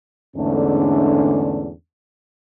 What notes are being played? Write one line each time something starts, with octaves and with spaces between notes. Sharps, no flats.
E2 G#2 D3 A3 C#4 D4